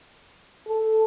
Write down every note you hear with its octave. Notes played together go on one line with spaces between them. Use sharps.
A4